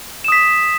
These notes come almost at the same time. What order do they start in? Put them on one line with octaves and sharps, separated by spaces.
E7 D#6 B6